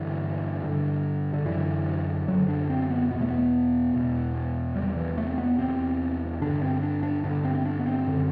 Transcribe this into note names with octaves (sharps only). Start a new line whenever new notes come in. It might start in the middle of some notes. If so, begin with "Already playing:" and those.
Already playing: G2 D3 E3
G2 D3
D3
F#2 D3 E3
F#2 D3 F#3
D4
C4
B3
E2 B2 B3
A3
B3
E2 B2
E2 C3 G3
E3
A3
C4
B3
E2 C3 C4
G2 D3 D4
C4
D4
D4
G2 D3 D4
C4
C4
D4
B3
C4
F#2 D3